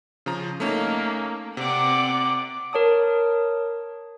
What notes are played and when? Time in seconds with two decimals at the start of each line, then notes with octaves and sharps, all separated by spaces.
0.26 C#3 F3 A#5
0.60 A3 A#3 C#4 D#4
1.57 C3 C4 D5 F#5 D6
2.73 A#4 C#5 A5 D#6